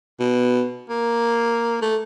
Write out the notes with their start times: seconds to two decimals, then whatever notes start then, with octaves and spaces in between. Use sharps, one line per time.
0.20 B2
0.89 A#3
1.82 A3